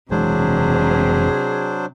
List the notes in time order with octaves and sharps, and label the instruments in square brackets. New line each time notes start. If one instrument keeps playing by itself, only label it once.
[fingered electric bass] F1 E3 G#3 [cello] C3 [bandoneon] F#3 D4 C5 [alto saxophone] G#4